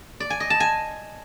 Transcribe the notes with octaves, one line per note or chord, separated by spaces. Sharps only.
D5
G#5
D#5
A5
G#5